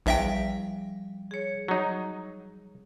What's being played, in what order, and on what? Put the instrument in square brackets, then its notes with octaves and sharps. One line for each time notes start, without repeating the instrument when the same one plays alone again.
[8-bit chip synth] A#1 E5 G5 [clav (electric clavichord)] E2 [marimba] F3 G3
[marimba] G#4 C#5
[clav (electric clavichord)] F#3 D#4